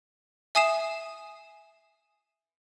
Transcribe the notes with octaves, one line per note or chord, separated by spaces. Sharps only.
E5 G#5 D#6 C7 E7